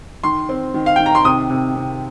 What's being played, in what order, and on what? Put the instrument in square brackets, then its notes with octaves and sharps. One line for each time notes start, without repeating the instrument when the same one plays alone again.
[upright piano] D#3 C6
C4
D#3
F5
D#3 G5
A#5
C6
C3 D#6
C3
C3